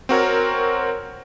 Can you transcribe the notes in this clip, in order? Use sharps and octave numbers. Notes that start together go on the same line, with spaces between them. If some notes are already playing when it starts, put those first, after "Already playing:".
C4 F#4 A#4 C#5